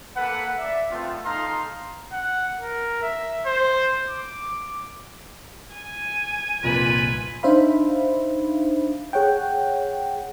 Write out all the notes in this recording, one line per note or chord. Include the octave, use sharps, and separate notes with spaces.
A#3 A4 B4 F#5
D5 E5
A3 B3 C4 F4
D#4 A4 F5 A#5 C6
F#5
A#4
E5
C5
D6
G#5
C2 F2 A#2 F4 B4
D4 D#4 C5 E5 F5 B5
G#4 C#5 F#5 G5